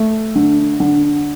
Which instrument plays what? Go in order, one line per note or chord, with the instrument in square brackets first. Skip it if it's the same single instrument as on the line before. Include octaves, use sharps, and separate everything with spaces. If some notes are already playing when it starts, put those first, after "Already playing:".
Already playing: [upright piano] A3
D3
D3